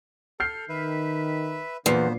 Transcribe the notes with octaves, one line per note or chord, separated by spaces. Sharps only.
A4 F6 G6 C7
D#3 B4 E5
E2 A#2 D3 F#3 A#3 B3 C5 C7